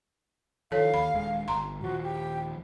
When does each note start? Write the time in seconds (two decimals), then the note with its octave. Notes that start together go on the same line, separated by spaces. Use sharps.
0.72 D#3 F3 A4 C#5 F5
0.94 D#2 B5
1.15 D#1 G#3
1.48 G1 A#5 C6
1.81 D#1 F3 F#4
2.03 G4